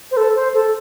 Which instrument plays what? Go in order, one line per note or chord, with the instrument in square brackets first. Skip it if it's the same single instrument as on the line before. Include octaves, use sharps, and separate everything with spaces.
[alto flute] C5
A4
C5
A4